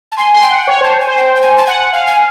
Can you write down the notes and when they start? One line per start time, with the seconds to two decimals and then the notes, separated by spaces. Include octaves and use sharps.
0.12 A5
0.17 G#5 C6
0.34 C6
0.42 G5
0.50 F#5
0.67 C#5
0.81 C5 A5
1.00 G#5
1.07 C5
1.17 G5
1.36 G5
1.42 G#5
1.58 A5
1.67 F#5 G#5
1.93 F5 G#5
2.07 G#5